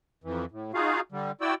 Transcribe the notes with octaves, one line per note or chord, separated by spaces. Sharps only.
F2 E3
A2
D#4 F4 F#4 G#4 F5
D3 G3
E4 F#4 D5 G5 E6